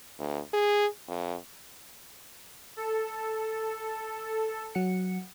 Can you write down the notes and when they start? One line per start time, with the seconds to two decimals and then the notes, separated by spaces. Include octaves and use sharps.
0.19 D2
0.53 G#4
1.08 F2
2.77 A4
4.75 F#3 F#5 C#7